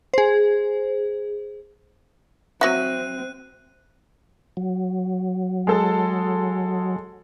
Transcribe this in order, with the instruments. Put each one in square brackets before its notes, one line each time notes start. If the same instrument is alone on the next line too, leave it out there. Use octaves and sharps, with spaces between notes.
[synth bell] G#4 C5
[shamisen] F#3 F#4 [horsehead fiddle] C4 [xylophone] E5 A#6 [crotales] F#6 D#7
[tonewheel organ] F#3
[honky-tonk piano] G#3 A4 A5